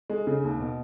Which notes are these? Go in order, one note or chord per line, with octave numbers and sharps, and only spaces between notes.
G#3
C#3
D#2
B2